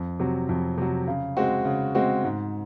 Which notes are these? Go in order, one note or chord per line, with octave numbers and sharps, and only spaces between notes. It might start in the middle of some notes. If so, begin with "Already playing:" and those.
Already playing: F2
C3 F#3
F2
C3 F#3
C#3
G#3 C4 F#4
C#3
G#3 C4 F#4
G#2